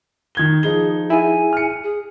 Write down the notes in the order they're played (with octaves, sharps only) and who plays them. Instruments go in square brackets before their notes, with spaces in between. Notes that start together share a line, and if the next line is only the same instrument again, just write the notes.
[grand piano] D#3 G#6 G7
[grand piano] F3 D#4 G7 [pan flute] G#4
[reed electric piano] E4 G#4 [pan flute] G#5
[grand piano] F6 C#7
[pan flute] G#4